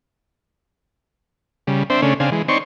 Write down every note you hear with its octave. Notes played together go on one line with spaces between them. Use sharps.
C#3 G3
C4 D4 C5 E5
C#3 A3 C#4 D4
C#3 C4 D4 F5 G#5
E3 G#3
C4 D#4 C#5 D5 C6 C#6